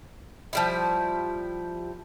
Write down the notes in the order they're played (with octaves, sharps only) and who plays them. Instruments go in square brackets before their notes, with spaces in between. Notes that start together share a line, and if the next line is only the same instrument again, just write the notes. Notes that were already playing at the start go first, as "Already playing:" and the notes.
[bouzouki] F3 G3 E4